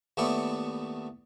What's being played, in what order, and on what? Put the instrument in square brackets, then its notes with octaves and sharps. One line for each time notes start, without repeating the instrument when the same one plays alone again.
[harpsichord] D#2 A3 B3 E4 D5 C#6